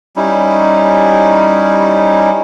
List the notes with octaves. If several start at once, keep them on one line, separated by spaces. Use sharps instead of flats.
G3 C#4 D#4 E4